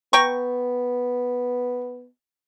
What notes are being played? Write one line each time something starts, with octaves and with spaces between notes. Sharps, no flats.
B3 G5 A#5 C#6